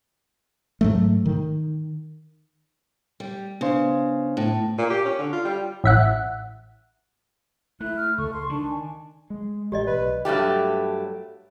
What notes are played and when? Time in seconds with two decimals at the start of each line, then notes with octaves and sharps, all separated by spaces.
0.81 G#2 F#3 A3
1.26 D#3
3.20 G3
3.61 C#3 B3 D4 C5
4.37 A2
4.78 A#2
4.90 G4
5.05 C#4
5.19 D3
5.33 F4
5.45 G3
5.84 A1 E5 F#5
7.81 A3 E4 F#6
7.97 F6
8.18 C#2 A4 C#6
8.33 C6
8.50 D#3 D4
8.71 G#5
9.30 G#3
9.72 A1 G4 D5 D#5
9.87 B1 B4
10.25 G2 F#3 A3 G4